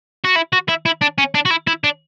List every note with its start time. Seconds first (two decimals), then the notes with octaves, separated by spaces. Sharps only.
0.25 F#4
0.36 E4
0.53 F#4
0.69 E4
0.86 E4
1.02 D4
1.18 C#4
1.35 D4
1.45 F#4
1.51 E4
1.67 E4
1.84 D4